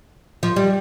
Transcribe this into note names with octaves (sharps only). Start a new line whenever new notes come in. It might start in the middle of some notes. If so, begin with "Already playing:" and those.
F3
G3